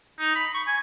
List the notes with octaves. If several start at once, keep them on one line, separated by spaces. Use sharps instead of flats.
D#4
B5
C#6
G#5